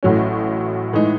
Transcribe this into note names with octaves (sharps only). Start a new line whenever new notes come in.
A1 A2 F#3 C#4
A2 E3 G#3 D#4